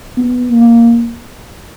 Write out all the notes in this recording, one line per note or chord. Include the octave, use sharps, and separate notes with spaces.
B3
A#3